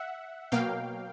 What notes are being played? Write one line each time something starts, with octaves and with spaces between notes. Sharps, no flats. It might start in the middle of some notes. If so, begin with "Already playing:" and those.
Already playing: E5 F#5
B2 F#3 A#3 F5 G5